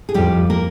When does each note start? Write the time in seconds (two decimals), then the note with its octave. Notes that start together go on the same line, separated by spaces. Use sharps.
0.09 G#4
0.14 F2 G3 G4
0.50 A#3 A#4